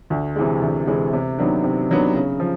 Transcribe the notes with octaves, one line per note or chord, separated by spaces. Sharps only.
D2
C3 E3 G#3
D2
C3 E3 G#3
C3
D#3 F#3 B3 D4
C3
D#3 F#3 B3 D4
C#3
F3